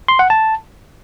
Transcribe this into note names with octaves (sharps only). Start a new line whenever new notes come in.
C6
F#5
A5